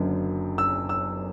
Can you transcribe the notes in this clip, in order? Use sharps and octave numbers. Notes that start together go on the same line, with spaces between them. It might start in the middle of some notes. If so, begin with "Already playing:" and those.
Already playing: F#1 F#2 D3
E6
E6